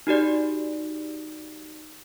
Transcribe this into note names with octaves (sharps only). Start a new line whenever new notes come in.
D#4 F#4 G4 D5